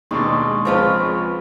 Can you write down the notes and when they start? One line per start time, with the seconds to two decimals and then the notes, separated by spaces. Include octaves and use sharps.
0.11 D#2 B2 G#3 D4 C6 C#6 D#6
0.65 C#2 F3 B3 C4 F4 B4